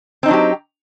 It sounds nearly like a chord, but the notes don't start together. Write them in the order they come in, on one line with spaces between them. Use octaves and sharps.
C4 D#4 D4 F#3 G4